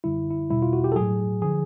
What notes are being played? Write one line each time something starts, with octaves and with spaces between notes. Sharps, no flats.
F#2 D3 G3 E4
E4
E2 B2 G3 E4
F4
F#4
G4
A4
A2 F#3 G#4
D3 F3 G#4